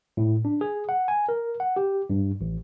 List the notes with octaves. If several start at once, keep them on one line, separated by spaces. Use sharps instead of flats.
A2
D4
G#4
F#5
G#5
A#4
F#5
G4
G2
A1